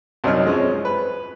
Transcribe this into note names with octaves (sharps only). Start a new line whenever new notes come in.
C2 F#2 F#3 D#4 F6
F3 G#3 C#4
B4